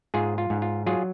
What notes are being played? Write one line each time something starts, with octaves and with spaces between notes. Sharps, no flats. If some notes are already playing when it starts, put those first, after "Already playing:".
G#2 F4 G#4
F4
G#2
F4
F#3 F4 G#4